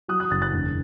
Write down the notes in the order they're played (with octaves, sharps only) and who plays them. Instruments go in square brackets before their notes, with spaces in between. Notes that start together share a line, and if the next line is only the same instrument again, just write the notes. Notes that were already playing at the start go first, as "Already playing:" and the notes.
[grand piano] F#3 D#6 F#6
D#6 F#6
F#1 F#6 A6
F#6 A6
E1